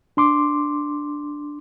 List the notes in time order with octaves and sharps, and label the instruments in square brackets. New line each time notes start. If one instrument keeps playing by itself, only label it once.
[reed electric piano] D4 C6 D6